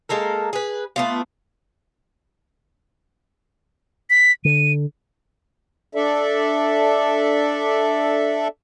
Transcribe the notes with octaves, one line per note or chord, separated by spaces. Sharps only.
G#3 A#3 A4 A#4
G#4 B4
A3 B3 F4
B6
D3 D#7
D4 A4 D5 E5